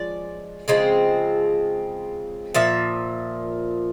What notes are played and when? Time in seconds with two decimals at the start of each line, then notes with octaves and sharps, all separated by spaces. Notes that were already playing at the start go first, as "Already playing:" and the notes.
Already playing: F3 G#3 C#4 D5
0.68 C#3 F3 G#3 C4
2.54 A#2 F3 E5